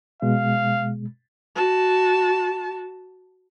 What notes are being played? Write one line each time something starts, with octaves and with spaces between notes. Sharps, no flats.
B2 G#3 F5
F#4 A5